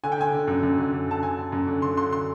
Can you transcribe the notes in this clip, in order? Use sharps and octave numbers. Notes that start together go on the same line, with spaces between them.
D3 G#5
G5
D3 G#5
D3
F#2
F#2
D3
D3
D3 A5
D3 G#5
D3
F#2
D3
D3 C6
D3 C6
C6